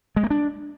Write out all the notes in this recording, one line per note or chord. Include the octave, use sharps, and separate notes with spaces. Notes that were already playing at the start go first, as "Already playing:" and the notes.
G#3
A#3
D4